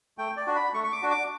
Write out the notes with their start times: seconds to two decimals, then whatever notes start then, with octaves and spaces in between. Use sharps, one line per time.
0.18 A3 G5
0.37 D5
0.47 D4 F#4
0.55 B5
0.74 A3 C#6
0.84 C#6
0.92 D6
1.02 D4 F#4
1.11 D6